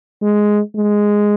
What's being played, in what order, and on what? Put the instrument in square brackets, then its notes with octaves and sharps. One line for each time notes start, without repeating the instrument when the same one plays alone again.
[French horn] G#3
G#3